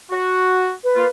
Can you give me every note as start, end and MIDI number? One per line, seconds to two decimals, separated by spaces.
0.11 0.72 66
0.84 1.08 71
0.96 1.06 58
0.96 1.06 65